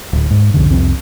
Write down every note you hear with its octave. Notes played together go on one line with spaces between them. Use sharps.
D1
G#2
B1 F2 D3
C2 F2 C4